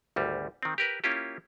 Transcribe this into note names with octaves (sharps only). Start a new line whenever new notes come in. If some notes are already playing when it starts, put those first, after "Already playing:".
G#1 D2 G3
D#3 C4
G4 A#4 B4
A#3 C#4 E4 F4 G4